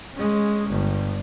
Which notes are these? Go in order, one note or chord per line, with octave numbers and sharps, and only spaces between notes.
G#3 C#4
G1